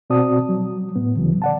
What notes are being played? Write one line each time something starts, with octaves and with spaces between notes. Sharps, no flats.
B2 C4 F#4 D5 A5 D#6
F#3
A2 B3
D2 C#3 E3 F#3
D5 F#5 A5